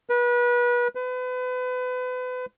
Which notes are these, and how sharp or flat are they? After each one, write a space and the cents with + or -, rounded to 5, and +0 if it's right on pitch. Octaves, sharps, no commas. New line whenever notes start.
B4 -30
B4 +35